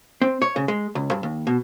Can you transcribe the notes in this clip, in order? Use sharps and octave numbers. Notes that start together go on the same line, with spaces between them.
C4
C#5
C#3
G#3
C#2
G2
D#2
B2